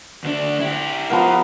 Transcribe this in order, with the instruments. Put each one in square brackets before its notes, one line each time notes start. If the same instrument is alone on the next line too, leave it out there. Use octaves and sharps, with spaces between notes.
[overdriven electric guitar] D2 D4
E4 G4
[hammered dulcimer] F3 B3 A#4